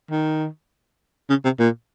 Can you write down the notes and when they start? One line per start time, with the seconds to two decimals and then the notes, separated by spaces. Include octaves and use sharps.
0.11 D#3
1.30 C#3
1.45 C3
1.60 A#2